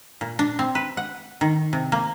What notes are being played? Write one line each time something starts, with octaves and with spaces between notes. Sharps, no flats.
A#2
D4
C4
B4
F#5
D#3
C3
A#3